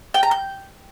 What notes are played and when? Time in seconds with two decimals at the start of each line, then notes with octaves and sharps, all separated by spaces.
0.14 G5
0.23 A#5
0.31 G6